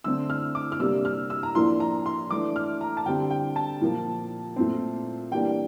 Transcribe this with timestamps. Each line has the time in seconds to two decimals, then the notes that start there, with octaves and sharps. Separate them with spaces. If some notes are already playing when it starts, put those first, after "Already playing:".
0.04 D3 A3 C4 E6
0.30 F6
0.55 D6
0.72 F6
0.80 C3 G3 A#3 D4 E6
1.05 F6
1.30 E6
1.43 A#5
1.55 A2 F3 A#3 D4 C6
1.80 A#5
2.06 C6
2.30 E3 A3 D4 D6
2.56 F6
2.81 A#5
2.97 A5
3.06 D3 G3 C4 G5
3.30 G5
3.56 A5
3.81 A#2 F3 A#3
4.56 A#2 A3 C4
5.32 E3 G3 A#3 D4 G5